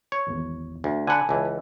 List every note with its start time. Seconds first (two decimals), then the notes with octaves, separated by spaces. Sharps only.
0.12 C#5
0.27 G#1 E2
0.84 D2
1.07 D3 F#5 G#5 A5 B5
1.29 C#2 E3